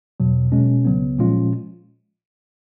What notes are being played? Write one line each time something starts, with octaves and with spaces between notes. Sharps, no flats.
E2 B2 F#3
B2 G#3 C#4
C#2 C#3 F#3 B3
A#2 F3 G#3 C#4 F4